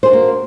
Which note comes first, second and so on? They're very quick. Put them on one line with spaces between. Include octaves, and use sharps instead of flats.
C5 G#4 D4 F#4 A#3